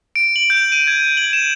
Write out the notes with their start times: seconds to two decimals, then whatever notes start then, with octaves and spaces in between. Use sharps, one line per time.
0.16 D7
0.36 F#7
0.50 G6
0.72 D#7
0.87 G#6
1.17 F#7
1.33 E7